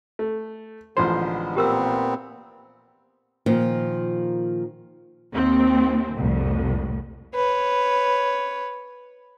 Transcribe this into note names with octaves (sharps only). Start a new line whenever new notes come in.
A3
A1 D3 F3 G#3 B3 C5
A#2 B3 C4 G4 A#4 E6
A#2 D#3 F3
D#2 C4
C2 F2 A2
B4 C#5